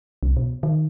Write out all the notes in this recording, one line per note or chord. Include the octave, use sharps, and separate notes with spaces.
C2
B2
D#3